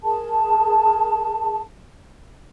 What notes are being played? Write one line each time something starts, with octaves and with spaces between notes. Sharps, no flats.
G#4 A#4 A5